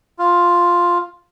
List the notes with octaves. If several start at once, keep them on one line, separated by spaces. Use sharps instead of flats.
F4